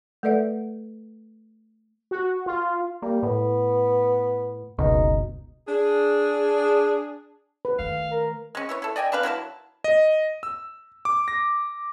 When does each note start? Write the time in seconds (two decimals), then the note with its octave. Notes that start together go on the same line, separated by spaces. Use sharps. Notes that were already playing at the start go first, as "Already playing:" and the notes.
0.23 A3 A4 B4 D5 E5 F#5
2.11 F#4
2.46 F4
3.02 G3 A#3
3.23 A2 B3
4.79 F#1 C#2 B2 D#4
5.68 D4 G#4
7.65 B4
7.79 D#3 A3 F5
8.11 A#4
8.55 G#3 C#4
8.69 E4 B4 C#5
8.82 E4 A4
8.96 D5 D#5 G5 G#5
9.12 C4 D4 B4 F5
9.23 F#3 E4 B4 A5
9.84 D#5
10.43 E6
11.05 D6
11.28 A#6